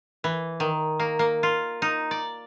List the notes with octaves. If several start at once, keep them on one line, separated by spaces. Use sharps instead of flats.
E3
D#3
A#3
A#3
F4
D#4
D5